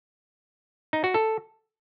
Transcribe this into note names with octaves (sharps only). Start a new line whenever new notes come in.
D#4
F#4
A4